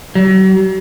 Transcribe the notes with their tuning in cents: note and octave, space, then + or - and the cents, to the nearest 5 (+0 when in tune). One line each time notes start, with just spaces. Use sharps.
F#3 +45